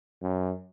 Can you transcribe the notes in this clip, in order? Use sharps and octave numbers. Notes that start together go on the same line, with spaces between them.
F#2